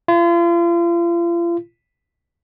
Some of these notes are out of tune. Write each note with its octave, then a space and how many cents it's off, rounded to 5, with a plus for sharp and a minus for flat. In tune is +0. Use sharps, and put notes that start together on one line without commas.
F4 -40